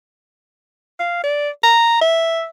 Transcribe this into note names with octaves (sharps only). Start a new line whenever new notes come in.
F5
D5
A#5
E5